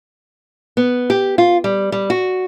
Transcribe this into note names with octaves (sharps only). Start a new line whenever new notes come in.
B3
G4
F4
G3
G3
F#4